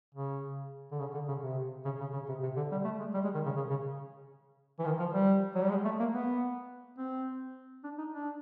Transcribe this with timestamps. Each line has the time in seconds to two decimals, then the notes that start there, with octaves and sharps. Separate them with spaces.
0.14 C#3
0.92 D3
0.99 C#3
1.14 D3
1.28 C#3
1.42 C3
1.85 C#3
2.00 C#3
2.13 C#3
2.28 C3
2.42 C3
2.56 D3
2.71 G3
2.84 A3
3.00 G#3
3.14 G3
3.24 G#3
3.34 D#3
3.45 C#3
3.56 C#3
3.70 C#3
4.79 E3
4.85 D#3
4.99 F3
5.13 G3
5.55 F#3
5.62 G3
5.69 G#3
5.85 A3
5.99 A#3
6.13 B3
6.98 C4
7.84 D4
7.98 D#4
8.12 D4